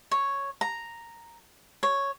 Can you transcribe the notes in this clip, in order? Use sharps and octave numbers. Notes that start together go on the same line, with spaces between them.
C#5
A#5
C#5